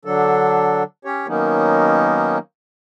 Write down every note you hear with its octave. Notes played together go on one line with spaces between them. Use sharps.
D3 F#3 D4 A4
C#4 G4 C#5
D#3 F#3 A#3 B3 C#4 D#4